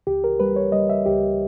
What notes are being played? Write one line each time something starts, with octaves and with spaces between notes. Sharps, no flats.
C#2 G4
A#4
G3 B4
C#5
G3 D#5
E5
C#2 G4